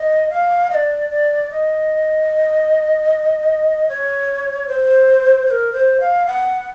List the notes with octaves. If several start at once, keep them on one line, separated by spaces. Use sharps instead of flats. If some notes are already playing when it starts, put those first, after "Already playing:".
Already playing: D#5
F5
D#5
D5
D5
D#5
C#5
C5
C5
A#4
C5
F5
F#5